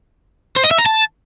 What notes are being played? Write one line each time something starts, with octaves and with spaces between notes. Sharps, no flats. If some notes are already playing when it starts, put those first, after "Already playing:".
C5
D#5
E5
A#5
A5